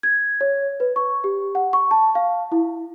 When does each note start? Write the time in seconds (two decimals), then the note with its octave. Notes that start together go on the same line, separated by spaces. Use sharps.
0.03 G#6
0.41 C#5
0.80 B4
0.96 C#6
1.24 G4
1.55 F#5
1.73 C#6
1.91 A5
2.15 F5
2.52 E4